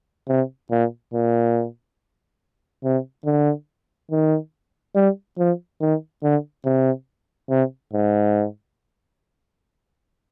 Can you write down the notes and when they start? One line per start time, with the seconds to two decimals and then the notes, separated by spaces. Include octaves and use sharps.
0.28 C3
0.71 A#2
1.14 A#2
2.84 C3
3.26 D3
4.11 D#3
4.96 G3
5.38 F3
5.81 D#3
6.23 D3
6.65 C3
7.50 C3
7.94 G#2